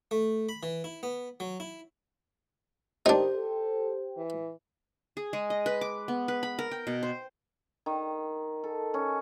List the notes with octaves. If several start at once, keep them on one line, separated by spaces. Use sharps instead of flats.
A3
B5
E3
E4
B3
F#3
E4
D#3 D4 D#4 G4 C5 G5
A4
E3
G#4
G#3
D#5
B4
D6
B3
B4
B5
A#4
G5
B2
C5
D#3
A4
C#4